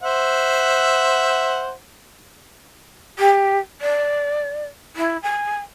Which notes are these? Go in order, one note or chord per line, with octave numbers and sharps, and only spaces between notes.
C5 E5 F#5
G4
D5
E4
G#5